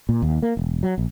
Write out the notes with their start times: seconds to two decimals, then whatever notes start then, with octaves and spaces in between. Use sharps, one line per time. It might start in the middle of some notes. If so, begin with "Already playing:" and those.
0.09 A#2
0.22 D#2
0.42 A#3
0.57 E1
0.83 F#3
0.98 A#1